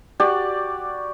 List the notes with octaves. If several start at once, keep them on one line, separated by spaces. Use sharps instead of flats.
F#4 G4 D5